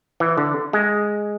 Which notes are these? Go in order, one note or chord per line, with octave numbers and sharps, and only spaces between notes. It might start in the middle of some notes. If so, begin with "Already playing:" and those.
E3
D3
G#3